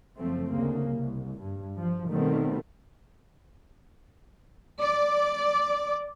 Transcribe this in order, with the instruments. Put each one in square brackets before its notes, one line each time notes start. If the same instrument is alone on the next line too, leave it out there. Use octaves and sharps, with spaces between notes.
[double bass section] F#1 F3 A3 C4
D2 C#3 A#3
C2
G2
F3
B2 D#3 G3 A3 B3 C4
[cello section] D5